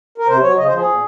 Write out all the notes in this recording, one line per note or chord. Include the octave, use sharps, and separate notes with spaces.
A#4
C3 C5
F#3 C#5
C#3 D#5
C5
F3 G#4
A#2